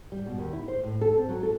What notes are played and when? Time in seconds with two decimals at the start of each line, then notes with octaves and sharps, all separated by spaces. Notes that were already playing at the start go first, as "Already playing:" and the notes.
0.12 G3
0.26 B2
0.38 D#2
0.53 E4
0.68 C5
0.84 A2
1.01 A4
1.17 C4
1.29 F#3
1.43 A4